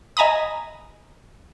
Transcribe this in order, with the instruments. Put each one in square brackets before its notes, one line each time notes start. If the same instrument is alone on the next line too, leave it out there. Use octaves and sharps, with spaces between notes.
[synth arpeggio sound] D#5 G#5 A#5 B5 D#6